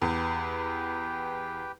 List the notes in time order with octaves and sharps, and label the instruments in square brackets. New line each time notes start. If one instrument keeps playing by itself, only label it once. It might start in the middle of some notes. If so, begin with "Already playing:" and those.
[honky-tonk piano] E2 [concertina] G4 B4 G5